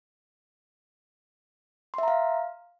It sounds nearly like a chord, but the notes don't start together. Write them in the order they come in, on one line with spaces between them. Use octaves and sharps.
C6 E5 A#5 F5